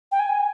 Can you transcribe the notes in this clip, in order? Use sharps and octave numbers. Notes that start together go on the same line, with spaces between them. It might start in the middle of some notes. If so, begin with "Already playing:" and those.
G5
G#5